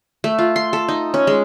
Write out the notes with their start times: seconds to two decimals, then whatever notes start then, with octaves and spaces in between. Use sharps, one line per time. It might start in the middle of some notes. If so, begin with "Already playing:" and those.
0.24 A3
0.39 F4
0.56 C6
0.73 A4
0.89 D#4
1.14 C#4
1.27 G#3